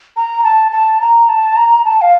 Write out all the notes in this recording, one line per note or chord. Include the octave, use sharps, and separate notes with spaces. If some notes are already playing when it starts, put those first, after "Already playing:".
A#5
A5
A5
A#5
A5
A#5
A5
F5